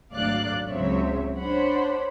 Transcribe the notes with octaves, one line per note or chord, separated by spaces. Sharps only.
G#1 D2 F#3 D5 F5 F#6
C#2 C#3 F#3 C4 C#5 E5
D4 C5 C#5 F#5 B5